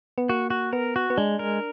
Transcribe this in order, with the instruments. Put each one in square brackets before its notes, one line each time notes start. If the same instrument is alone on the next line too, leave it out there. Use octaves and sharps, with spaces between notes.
[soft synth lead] B3
[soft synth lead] A#3 [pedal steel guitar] F#4
[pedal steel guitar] F#4
[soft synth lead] B3 [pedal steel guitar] A#4
[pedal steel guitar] F#4
[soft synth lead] B3
[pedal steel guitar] G#3 [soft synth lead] D4
[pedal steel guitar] A#4